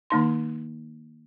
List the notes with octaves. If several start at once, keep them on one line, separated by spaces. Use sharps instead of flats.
D#3 A#3 D#4 C6